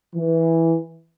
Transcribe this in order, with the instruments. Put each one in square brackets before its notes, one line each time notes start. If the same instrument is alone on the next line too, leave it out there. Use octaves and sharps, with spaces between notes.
[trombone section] E3